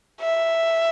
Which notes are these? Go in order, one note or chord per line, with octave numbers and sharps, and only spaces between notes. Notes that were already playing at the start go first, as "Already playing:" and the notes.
E5